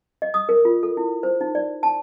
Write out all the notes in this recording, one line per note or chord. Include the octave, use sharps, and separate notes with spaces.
D#5
D#6
A#4
F4
A4
E4
C5
D#4
D5
A5